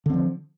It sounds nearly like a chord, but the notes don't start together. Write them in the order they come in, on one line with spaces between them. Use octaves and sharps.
D3 C4 F3